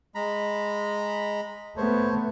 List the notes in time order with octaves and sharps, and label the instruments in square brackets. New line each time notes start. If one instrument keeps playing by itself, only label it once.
[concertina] G#3 A#5 B5
[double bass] A3 B3 [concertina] C5 C#5